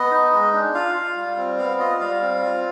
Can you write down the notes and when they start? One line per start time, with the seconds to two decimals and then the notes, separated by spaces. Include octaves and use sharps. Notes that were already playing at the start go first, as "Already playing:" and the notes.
Already playing: B3 D#5
0.11 D#4
0.33 G#3
0.53 D4
0.75 F4 F5
0.95 F4
1.17 G3
1.37 C4
1.58 B3 F5
1.79 F4 D#5
2.00 G3 F5
2.21 C4
2.42 F4